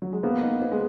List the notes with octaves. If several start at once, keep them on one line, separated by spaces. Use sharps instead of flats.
F#3
G#3
A#3 B3
D#4
B3
G#3